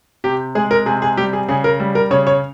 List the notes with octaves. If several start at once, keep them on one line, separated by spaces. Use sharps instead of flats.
C3 G4
G#3 G#4
A#4
C3 G#4
G#4
G3 G4
G#4
C#3 G#4
A#4
G3
A#4
C#3 C#5
C#5